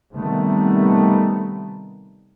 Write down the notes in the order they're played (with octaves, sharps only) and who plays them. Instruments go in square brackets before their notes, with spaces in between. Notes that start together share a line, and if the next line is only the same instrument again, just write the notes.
[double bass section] C3 D#3 G3 A3 B3